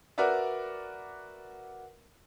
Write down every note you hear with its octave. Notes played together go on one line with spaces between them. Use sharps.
F#4 A#4 B4 D5 E5